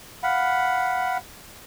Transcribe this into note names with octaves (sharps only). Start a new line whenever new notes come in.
F5 F#5 B5